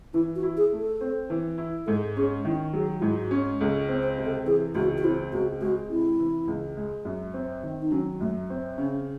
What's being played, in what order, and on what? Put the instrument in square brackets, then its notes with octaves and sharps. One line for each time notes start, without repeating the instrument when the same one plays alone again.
[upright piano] E3 [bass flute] E4
[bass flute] F#4
[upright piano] E4
[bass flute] G#4
[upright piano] A3
[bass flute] A4
[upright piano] C4
E3
E4
[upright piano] G#2 [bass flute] A4
[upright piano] C#4 [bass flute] G#4
[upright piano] D#3 [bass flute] E4
[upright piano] F#3 [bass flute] G#4
[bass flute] F#4
[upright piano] G#2 [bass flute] E4
[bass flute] F#4
[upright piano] C#4
[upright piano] C#2 [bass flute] A4
[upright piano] C4
[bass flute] C5
[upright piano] C3
[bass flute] A4
[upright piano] E3 [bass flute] G#4
[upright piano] C#2 [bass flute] F#4
[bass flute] F#4
[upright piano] C4 [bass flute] E4
[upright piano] C#2 [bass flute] F#4
[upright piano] G#3 [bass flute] F#4
[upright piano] C3 [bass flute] E4
[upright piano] E3
C#2
G#3
F#2
C4
D#3
[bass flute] D#4
[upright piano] F#3 [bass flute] C#4
[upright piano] F#2 [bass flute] A3
[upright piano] C4
[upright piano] C#3 [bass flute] C#4